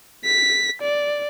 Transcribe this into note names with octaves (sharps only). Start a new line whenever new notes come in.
B6
D5